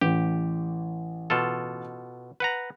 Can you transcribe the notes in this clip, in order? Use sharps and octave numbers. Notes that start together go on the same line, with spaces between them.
A1 G4
B2 F4 A4
B4 F#5 A#5